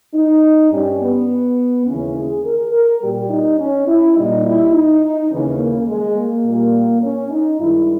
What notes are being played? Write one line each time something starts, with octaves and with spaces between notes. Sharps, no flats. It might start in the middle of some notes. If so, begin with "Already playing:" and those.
D#4
G2 G3 C#4
B3
D#2 C#3 E3 G#3 C#4
G#4
A#4
A#4
A#2 G3 G4
D#4
C#4
E4
A#2 G3 D#4
E4
D#4
D#2 C#3 E3 C#4
A#3
G#3
A#3
A#2 G3
C#4
D#4
G2 D#3 G#3 E4